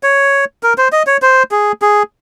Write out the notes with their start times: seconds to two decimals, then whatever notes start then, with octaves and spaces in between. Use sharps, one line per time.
0.03 C#5
0.63 A#4
0.78 C5
0.92 D#5
1.07 C#5
1.22 C5
1.51 G#4
1.82 G#4